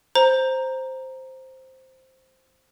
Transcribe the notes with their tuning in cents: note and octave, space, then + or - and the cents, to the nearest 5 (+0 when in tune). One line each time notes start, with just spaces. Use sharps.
C5 +0 A#5 +0